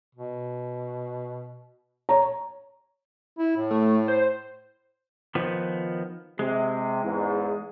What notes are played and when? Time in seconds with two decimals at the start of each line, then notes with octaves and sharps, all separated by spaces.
0.15 B2
2.09 C#5 A#5
3.38 E4
3.57 A2
3.71 A3
4.08 C5
5.35 D#3 F3 B3
6.39 C3 G#3
7.03 E2 G#2